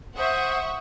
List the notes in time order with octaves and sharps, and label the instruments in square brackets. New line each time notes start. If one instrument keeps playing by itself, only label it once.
[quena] C5 [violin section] E5 F#5 C#6 [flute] D#6